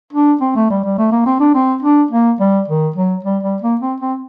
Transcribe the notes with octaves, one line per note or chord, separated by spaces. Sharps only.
D4
C4
A3
G3
G3
A3
A#3
C4
D4
C4
D4
A#3
G3
D#3
F#3
G3
G3
A#3
C4
C4